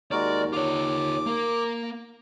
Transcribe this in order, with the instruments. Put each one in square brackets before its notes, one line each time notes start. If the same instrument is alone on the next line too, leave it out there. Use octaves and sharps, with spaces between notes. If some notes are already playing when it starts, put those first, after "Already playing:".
[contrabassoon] D#2 [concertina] G#3 F#4 A#4 [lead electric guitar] D5
[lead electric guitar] F4 C#5 [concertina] D6
[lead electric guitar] A#3 A#4